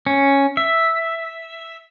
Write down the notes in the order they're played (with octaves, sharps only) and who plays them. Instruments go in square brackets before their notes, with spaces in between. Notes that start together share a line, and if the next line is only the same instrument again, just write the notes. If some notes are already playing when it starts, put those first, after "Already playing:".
[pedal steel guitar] C#4
E5